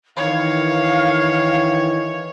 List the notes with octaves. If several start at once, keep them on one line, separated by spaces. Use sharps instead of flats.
D#3 E3 C#5 F5